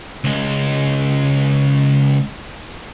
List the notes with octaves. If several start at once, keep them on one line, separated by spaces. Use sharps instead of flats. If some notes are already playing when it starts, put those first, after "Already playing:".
C#2 G#3